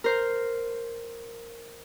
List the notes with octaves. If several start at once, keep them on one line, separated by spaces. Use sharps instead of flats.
A#4 C5